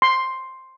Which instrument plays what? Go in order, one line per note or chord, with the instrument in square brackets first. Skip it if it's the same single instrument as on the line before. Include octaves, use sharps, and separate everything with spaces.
[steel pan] C6